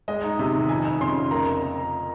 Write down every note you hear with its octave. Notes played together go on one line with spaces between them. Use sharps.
G#3 D#5
D#4
C3
D#3
F2 G#5
F2
C#3 C6
F2
A#3 A#5